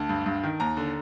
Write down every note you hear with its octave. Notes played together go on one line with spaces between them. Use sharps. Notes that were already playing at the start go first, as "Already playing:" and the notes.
Already playing: D2 A5
G2
G2
D#3
D#2 A#5
D3